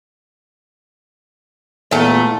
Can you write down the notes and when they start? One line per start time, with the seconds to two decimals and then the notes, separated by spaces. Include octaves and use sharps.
1.91 E2 A#2 A3